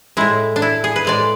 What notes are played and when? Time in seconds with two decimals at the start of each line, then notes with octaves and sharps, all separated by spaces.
0.17 A2 G#3 E4
0.56 D4
0.62 E4
0.84 G#4
0.96 B4
1.05 A2 G#3 D5